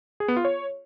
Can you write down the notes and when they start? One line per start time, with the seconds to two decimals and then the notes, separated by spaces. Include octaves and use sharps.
0.20 G#4
0.28 B3
0.37 F4
0.45 C#5